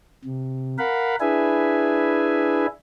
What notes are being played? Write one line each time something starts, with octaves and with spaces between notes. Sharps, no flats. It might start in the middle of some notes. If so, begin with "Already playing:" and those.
C3
A#4 F5 F#5 B5
D4 E4 G#4 B4 E5 G#5